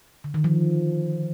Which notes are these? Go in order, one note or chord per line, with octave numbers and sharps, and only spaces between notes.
D3
D#3
F3